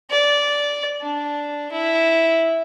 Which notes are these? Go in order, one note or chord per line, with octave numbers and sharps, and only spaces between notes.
D5
D4
E4